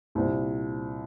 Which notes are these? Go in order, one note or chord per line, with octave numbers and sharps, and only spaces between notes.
C2 A#2 C5